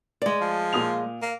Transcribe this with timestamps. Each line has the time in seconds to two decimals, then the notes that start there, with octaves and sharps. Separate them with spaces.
0.22 G#3 D5
0.41 F3
0.73 A#2 D#6 F7
1.22 A#3